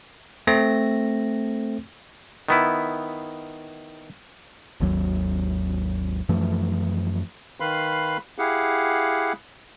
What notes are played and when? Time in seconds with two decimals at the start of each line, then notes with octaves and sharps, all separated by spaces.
0.47 A3 C4 A#6
2.49 D#3 B3 E4
4.80 G#1 D#2 F#3
6.29 F#2 E3 F3 A3
7.60 D#3 B4 F5 B5 C6
8.38 E4 G4 G#4 F5 F#5